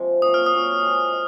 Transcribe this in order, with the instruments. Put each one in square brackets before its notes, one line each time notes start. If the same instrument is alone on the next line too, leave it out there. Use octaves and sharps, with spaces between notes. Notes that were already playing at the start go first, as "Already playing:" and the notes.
Already playing: [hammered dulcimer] C3 F3 G#3
[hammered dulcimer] A#2 F#3 C#4 [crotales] D#6
[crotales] F6
D#6
[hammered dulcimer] A#2 F#3 C#4
G#3 C4 F4 G#4
G#3